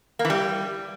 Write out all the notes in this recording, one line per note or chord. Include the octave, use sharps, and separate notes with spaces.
A#3
E3
G3